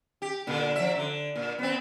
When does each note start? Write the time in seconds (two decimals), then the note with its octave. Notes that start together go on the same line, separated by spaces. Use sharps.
0.22 G4
0.47 A#2 D3
0.76 F3 E5
0.96 D3
1.35 A#2
1.58 B3 C4